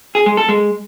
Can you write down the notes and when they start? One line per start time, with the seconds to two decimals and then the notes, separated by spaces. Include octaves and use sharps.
0.15 G#4
0.26 G#3
0.37 A4
0.49 G#3